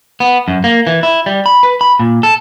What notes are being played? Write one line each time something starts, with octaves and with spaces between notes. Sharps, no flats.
B3
F#2
A#3
E3
E4
G3
B5
B4
B5
A#2
A4